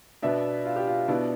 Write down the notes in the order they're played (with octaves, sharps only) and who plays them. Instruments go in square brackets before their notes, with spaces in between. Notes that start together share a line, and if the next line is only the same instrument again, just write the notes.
[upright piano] B2 B3 D4 E5
F4
G4
F4
B2 B3 D4 E4